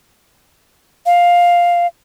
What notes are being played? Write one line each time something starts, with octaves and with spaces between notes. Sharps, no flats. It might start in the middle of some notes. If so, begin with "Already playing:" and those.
F5